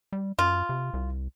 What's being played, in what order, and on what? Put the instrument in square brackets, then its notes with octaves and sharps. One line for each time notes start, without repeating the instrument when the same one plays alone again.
[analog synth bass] G3
[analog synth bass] F#2 [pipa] F4
[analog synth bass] C3
C2